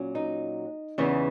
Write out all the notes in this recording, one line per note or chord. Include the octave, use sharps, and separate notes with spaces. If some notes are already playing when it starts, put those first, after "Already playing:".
Already playing: A#2 F#3 C#4
D#4
E2 C#3 E3 B3